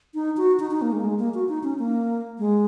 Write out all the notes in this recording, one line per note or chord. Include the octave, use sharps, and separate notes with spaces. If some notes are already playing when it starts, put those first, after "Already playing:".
D#4
F#4
D#4
D#4
A#3
G#3
A#3
G#3
A#3
F#4
D#4
C#4
A#3
G#3